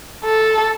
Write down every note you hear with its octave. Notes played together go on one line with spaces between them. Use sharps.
A4